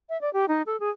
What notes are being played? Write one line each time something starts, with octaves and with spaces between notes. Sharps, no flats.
E5
D5
G4
D#4
A4
G#4